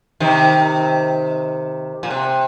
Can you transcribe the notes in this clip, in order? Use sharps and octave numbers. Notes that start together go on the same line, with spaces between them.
C3 D#3
A#2
C3